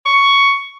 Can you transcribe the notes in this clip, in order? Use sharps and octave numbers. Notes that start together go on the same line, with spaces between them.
C#6